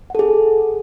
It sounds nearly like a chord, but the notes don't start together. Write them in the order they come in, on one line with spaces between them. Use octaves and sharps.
F#5 A4 G#4